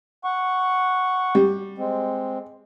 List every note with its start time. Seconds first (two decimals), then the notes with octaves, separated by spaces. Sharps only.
0.24 F#5 C#6
1.35 G3
1.78 G#3 C4